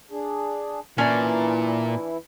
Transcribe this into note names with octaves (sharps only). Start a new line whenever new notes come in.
D4 G#4
A#2 E3 C#4 D4 E4 D5